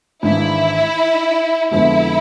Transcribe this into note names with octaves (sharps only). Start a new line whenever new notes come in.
G#1 G#2 E3 G#3 D4 E4
F2 D3 F3 G#3 B3 E4